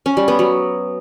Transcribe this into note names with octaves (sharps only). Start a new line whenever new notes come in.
C#4
G3
B3
F#3